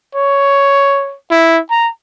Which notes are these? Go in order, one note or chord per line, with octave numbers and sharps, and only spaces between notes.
C#5
E4
A#5